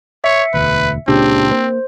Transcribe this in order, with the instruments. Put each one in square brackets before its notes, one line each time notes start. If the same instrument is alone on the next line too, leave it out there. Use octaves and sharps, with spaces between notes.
[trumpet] C#5 [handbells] E5 C#7
[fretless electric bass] E1 D2 [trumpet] B4
[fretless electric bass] C#2 A#2 C#3 [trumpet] C4 [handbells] D4 G4
[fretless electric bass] A#3 [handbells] C5